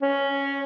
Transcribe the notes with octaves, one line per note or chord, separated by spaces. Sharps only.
C#4